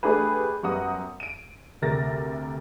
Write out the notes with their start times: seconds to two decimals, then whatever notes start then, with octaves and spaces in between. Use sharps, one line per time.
0.03 A3 D4 G4 G#4 B4
0.63 F#2 G3 B3 F#5 A#5 D#6
1.20 D7 D#7
1.82 D2 C3 A#4 A6 A#6